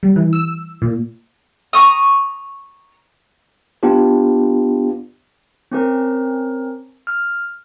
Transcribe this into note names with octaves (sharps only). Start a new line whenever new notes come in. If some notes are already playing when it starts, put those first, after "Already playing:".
G3
E3
E6
A#2
A#5 C#6 D#6
B3 D4 F4 G4
C4 C#4 A#4
F6